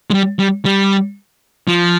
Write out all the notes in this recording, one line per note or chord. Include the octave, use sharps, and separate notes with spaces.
G#3
G3
G3
G3
F3